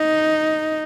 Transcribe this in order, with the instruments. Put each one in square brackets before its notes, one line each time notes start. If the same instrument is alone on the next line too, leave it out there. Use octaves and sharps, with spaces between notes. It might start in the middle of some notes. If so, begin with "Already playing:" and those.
Already playing: [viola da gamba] D#4